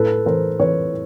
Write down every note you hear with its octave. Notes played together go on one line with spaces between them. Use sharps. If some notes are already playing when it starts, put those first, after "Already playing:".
Already playing: A2 A4 B4
E3 A#4 C5
E3 B4 C#5